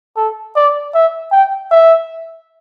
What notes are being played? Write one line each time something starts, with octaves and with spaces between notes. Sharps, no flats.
A4
D5
E5
G5
E5